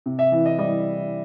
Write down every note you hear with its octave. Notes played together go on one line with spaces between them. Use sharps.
C3
E5
E3
D#5
G3 D#5